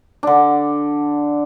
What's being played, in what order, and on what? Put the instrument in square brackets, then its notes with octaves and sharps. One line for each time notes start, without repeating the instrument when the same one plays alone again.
[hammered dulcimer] D3 D4